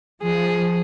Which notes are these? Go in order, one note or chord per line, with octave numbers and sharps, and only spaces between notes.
F3 G#4